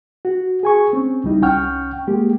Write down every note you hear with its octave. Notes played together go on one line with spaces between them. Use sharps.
F#4
G#4 G#5 C#6
C4 C#4
C#2 G3 D#4 E4
C2 C#4 F#5 G5 C#6 F6
G#3 A#3 G4